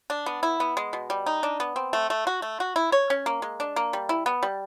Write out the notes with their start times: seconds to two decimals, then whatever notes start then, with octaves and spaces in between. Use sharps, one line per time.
0.10 D4
0.26 B3
0.43 E4
0.60 B3
0.77 G#3
0.93 B2
1.10 G3
1.26 D#4
1.43 D4
1.60 B3
1.76 C4
1.93 A3
2.10 A3
2.27 F#4
2.42 A3
2.60 F#4
2.76 E4
2.92 C#5
3.10 C#4
3.26 A#3
3.42 G#3
3.60 D4
3.76 A#3
3.93 G3
4.09 E4
4.26 B3
4.43 G3